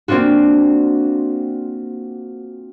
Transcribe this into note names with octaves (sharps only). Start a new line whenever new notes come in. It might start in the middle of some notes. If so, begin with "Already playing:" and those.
A#3 C4 D4 F4 F#4